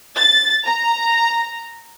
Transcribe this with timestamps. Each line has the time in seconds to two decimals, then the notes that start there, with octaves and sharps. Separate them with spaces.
0.16 A6
0.66 A#5